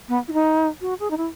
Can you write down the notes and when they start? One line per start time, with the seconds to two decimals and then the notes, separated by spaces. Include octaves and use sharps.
0.09 B3
0.28 E4
0.33 D#4
0.81 F#4
1.00 G#4
1.11 D#4
1.17 E4